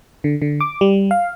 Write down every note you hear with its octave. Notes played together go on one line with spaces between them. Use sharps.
D3
D3
D6
G3
F5